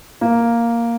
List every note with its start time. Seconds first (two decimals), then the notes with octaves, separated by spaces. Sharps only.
0.21 A#3